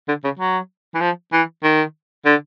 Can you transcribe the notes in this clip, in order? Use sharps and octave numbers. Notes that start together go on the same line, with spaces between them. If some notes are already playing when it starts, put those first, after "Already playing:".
D3
C#3
F#3
E3
F3
E3
D#3
D3